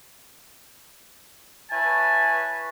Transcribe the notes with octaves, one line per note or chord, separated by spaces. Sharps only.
E4 B4 C#5 G#5 A5